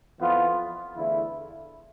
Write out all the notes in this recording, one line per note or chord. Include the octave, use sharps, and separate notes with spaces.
F2 E3 B3 F4
E2 D3 A3 E4